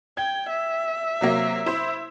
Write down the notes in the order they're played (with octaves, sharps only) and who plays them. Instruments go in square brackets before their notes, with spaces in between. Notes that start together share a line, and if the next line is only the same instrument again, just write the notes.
[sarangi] G5 [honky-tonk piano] G#6
[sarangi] E5
[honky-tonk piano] C3 F#3 A#3
E4 C5